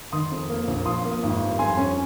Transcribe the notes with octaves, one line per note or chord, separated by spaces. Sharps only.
D#3 C6 D#6
F2
A#3
A#1
F3 C6 D#6
A#3
G#1
G2
F2 G#5 C6
C#4